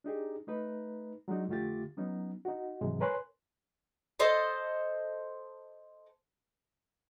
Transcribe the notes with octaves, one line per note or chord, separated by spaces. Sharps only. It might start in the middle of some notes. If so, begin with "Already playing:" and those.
D4 D#4 G4 G#4
A3 D#4 B4
F#3 G#3 D4 D#4 F#4
F2 D3 A3 F4 G4 A6
F#3 B3 C#4 D#4
D#4 F#4
G#2 C3 E3 F#3 G#3
A#4 B4 C#5 G#5 C6 F#6
A4 C5 D#5 A5